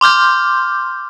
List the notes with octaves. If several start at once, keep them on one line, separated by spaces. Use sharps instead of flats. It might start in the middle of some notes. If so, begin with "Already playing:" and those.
C6 D6 F6 G6